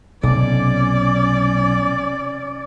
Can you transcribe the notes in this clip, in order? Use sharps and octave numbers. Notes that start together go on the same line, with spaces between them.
B1 C3 C#4 D5